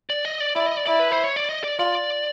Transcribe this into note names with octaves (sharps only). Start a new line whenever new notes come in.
D5
D#5
D5
E4 D5
D#5
D5
E4 D5
B4
C5
C#5
D5
D#5
D5
F4 D5